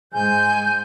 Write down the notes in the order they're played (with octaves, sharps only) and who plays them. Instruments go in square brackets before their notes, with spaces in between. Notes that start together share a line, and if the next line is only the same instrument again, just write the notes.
[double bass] G#2 G#3 [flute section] G#5 G6